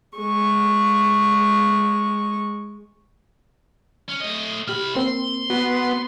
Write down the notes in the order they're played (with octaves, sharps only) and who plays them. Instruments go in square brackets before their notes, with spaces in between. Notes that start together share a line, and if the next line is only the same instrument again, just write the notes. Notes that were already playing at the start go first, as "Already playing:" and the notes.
[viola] G#3 C#6
[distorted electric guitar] C#4
A3 D#5
[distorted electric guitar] C2 B5 [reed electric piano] G4 F6
[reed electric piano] A#3 C4 [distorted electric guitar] C6
[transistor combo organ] B3 [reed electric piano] F#4